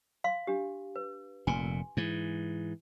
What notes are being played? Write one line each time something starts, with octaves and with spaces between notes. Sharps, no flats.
F5 C6
D4 G4
B4
F1 A#2 G#5 C6
G#2 E3